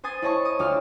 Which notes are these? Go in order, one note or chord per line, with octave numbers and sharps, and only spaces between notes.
C5 G#5 D#6 A6 C7
E4 C#5 D#5 A5 C#6
D#6
D2 F4 D6 E6 F6